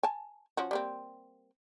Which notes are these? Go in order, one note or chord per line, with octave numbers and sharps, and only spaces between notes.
G#5 A5
F3 C#4 F#4
G3 A#3 C4